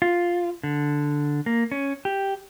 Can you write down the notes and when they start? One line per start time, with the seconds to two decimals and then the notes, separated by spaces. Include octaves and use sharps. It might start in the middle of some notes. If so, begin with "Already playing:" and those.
0.02 F4
0.63 D3
1.46 A#3
1.72 C#4
2.05 G4